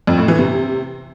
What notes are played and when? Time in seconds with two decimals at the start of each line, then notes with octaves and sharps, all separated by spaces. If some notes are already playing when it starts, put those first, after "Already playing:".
0.07 F2
0.18 A2
0.28 E3
0.39 C3